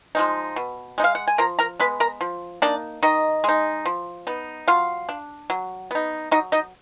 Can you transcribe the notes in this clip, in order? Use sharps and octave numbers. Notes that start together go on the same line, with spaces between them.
F3 G#3 D#4
B2
G#3 D#4
F5
F#5
G#5
F3 A#4 A#5
A#4 A#5
G#3 B3 B4 B5
A#4 A#5
F3
A#3 D4 D#4 D5
D#3 D#4 D#5
G#3 D#4
F3
B3 D#4
F#3 F4 F5
D4
F#3
B3 D#4
F#3 D#4 D#5
D#4 D#5